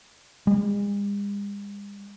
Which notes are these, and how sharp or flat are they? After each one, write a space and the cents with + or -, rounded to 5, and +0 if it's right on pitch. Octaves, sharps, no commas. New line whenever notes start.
G#3 -45